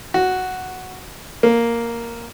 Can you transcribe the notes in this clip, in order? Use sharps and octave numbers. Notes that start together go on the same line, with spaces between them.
F#4
A#3